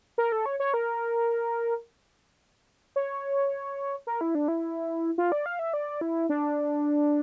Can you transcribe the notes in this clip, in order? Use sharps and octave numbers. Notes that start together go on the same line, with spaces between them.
A#4
A4
C#5
C#5
A#4
C#5
A#4
E4
D4
E4
F4
D5
F5
E5
D5
E4
D4